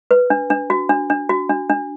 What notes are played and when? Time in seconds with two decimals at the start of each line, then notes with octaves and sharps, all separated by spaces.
0.11 B4
0.30 D4
0.50 D4
0.70 F#4
0.89 D4
1.10 D4
1.29 F#4
1.49 D4
1.70 D4